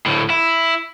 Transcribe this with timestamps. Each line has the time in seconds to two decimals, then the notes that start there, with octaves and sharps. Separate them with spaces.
0.06 D2 A2
0.30 E4